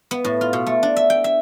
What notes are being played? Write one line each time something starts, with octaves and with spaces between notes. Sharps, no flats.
B3
A2
F4
B2
A3
D4
E5
G5
E5